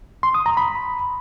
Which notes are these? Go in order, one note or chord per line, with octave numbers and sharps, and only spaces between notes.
C6
D#6
A#5
B5